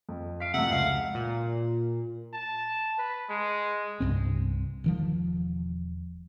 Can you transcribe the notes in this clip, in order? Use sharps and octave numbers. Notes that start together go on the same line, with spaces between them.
F2
F5 B6 D7
F2 A2 C3 E5 F#5
C#2 F5
A#2
A5
B4
G#3
C2 G2 C4
E1 D#3 F3